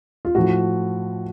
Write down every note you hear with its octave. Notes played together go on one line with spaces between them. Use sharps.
F4
A2 F3 F#4